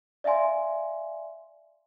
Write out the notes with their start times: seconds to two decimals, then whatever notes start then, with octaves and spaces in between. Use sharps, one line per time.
0.24 D5 E5 F5 G#5 C6